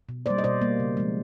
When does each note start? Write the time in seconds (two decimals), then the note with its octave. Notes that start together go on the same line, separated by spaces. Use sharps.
0.09 B2
0.26 G3 A#3 C5 D5
0.38 D#5
0.44 B2 C5 D5
0.61 G3 A#3
0.80 C#3
0.97 F3 G#3